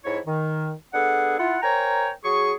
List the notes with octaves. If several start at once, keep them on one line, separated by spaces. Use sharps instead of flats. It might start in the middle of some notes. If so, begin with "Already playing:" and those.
F2 G#2 E4 C#5
D#3
B3 D4 G#4 A4 F#5
E4 F4 F#5
A#4 C5 C#5 G5 G#5 A#5
F#3 G#4 C#6